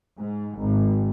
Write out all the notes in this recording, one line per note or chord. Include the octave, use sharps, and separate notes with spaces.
G#2
G#1